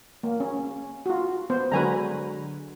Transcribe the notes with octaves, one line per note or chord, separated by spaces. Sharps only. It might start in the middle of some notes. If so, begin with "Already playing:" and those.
A#3
C#4
F4 F#4
B3 C5
D3 F#3 G#3 B4 G#5 A#5